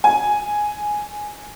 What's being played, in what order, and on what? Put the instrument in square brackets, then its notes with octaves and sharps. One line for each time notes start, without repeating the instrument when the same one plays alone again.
[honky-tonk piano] G#5